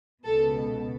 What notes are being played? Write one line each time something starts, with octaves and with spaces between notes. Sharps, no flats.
C#2 B2 A4